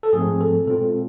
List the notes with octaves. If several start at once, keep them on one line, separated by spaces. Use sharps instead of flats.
A4
G#2 F3 A3 C4 G#4
A4
B2 G#3 C4 F4 A4